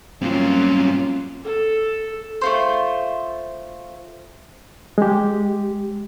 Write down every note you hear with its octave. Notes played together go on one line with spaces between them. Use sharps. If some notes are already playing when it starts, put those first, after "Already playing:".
G2 F#3 A#3 C4 C#4 F4
A4
A3 F4 C5
G#3 G4